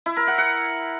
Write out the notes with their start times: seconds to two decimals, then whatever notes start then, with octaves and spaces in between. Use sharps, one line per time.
0.06 E4
0.17 A#4
0.27 F#5
0.38 F#5